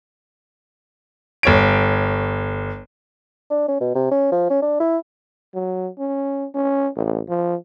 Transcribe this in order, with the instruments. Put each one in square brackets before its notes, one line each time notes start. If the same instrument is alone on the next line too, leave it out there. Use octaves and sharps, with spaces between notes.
[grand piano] G1 C#5 D7
[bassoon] D4
C#4
B2
C3
C#4
F3
C#4
D4
E4
[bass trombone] F#3
C#4
C#4
A1
F3